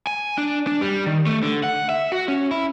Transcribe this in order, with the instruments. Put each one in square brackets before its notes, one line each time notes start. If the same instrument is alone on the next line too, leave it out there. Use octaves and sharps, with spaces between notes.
[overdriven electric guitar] G#5
D4
D4
G3
D#3
A3
D3
F#5
E5
F#4
C#4
E4